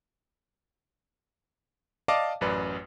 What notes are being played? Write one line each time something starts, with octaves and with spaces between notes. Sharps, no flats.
D5 D#5 F5 A5 D6
A1 F#2 B4 D5